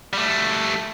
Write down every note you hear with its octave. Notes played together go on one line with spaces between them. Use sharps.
G3 A3